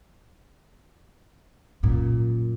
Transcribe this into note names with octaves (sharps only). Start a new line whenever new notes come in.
F#2 A#2